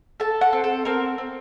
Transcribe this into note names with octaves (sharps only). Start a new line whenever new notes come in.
A4 A5
F#5
C4
A4
C4 A#4
C4